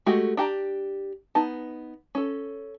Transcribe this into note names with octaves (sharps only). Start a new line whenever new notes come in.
G#3 A3 F#4 G4
D4 G4 A#5
B3 D#4 A5
C#4 A4